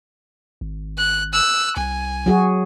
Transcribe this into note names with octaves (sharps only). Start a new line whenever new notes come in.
G#1
F#6
E6 F#6
C2 G#5
F#3 F#4 G#4